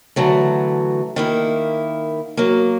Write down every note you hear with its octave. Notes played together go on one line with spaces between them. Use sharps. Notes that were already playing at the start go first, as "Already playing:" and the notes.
D3 E3 F#3 A3
D#3 A#3 E4
F#3 A#3